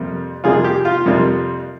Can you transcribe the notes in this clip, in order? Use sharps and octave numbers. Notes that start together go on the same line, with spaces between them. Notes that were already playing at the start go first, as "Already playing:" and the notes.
Already playing: F2 C3 G3 A#3
F2 C3 G3 A#3 F4 G#4
G4
F4
F2 C3 G3 A#3